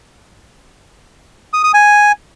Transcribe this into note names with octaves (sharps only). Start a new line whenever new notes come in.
D#6
D#6
G#5